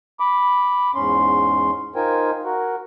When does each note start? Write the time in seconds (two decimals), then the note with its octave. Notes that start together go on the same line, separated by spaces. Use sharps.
0.20 B5 D6
0.95 E2 G#2 C#4 C6
1.95 D#4 F4 A#4 C5 G5 G#5
2.44 F#4 A#4